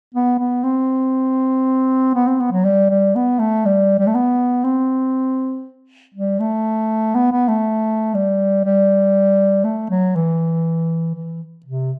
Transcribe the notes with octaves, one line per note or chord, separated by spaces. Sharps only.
B3
B3
C4
B3
C4
B3
F#3
G3
G3
B3
A3
G3
G3
A3
B3
C4
G3
A3
B3
B3
A3
G3
G3
A3
F#3
E3
E3
C3